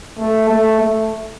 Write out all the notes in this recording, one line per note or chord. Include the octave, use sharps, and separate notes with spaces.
A3
A3
A3